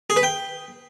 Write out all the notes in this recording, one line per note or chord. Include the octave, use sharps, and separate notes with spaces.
G#4
B4
G5